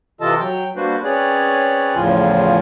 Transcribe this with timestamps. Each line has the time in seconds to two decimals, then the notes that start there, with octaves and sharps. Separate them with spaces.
0.21 C3 E3 F4 A4 D#5 A5
0.40 F#3 G5
0.76 G3 A#3 D4 F#4 B4 C5
1.04 C4 C#4 G#4 B4 C#5 D5
1.95 E2 A2 C#3 F3 F4 G#5